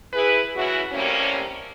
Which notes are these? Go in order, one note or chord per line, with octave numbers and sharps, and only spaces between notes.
E4 G#4 B4
C#3 E3 F#3 E4 F#4
A2 C3 G3 A#3 C#4